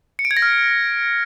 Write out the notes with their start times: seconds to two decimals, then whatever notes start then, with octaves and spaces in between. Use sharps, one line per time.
0.19 C#7
0.25 D7
0.31 G#6
0.37 A#6
0.42 F6